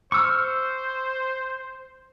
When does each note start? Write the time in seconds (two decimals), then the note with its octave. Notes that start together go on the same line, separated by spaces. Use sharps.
0.12 C5 C#6 E6 F6